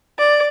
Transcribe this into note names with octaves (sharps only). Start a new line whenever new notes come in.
D5